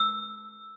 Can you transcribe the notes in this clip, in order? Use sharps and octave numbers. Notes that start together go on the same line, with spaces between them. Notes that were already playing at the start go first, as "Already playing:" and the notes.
Already playing: E6